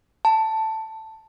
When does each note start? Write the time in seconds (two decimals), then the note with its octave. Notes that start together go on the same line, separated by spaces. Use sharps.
0.25 A5